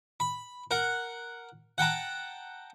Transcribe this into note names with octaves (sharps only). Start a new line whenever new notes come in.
B5
A#4 F#5
F#5 G5 A5 A#5